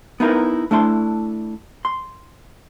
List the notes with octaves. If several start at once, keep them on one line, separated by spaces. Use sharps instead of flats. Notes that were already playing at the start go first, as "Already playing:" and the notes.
B3 D#4 E4 A#4 B4
A3 D4 E4 A5 C6
C6